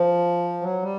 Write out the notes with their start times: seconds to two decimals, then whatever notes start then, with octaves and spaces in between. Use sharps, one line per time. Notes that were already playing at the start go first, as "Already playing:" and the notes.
Already playing: F3
0.61 F#3
0.83 G3